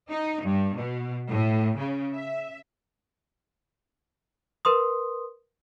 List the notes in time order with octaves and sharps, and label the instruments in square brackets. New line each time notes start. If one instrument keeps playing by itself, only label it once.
[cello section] D#4
G2
B2
A2
C#3
E5
[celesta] A#4 B4 C6 D#6